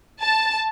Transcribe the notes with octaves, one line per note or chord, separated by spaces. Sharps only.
A5